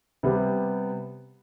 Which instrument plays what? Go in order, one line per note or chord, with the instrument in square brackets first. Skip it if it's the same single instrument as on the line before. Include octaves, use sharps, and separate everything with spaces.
[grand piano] C3 G3 B3